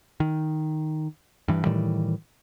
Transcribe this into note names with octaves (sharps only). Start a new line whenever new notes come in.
D#3
G2 E3
A2 D#3 E3 G3